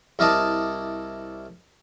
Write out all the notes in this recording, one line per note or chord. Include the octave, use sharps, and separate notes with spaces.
C2 E4 A#4 D5 D#5 A5